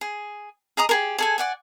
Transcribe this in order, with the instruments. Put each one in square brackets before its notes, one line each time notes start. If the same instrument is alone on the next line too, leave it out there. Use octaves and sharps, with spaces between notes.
[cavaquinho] G#4
G#4 D#5 A#5 D#6
G4 G#4 A#4
G#4 A4 G#5
D5 F#5 G#5